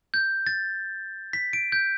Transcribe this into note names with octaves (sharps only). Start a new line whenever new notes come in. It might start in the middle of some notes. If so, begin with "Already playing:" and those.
G6
A6
B6
D7
G6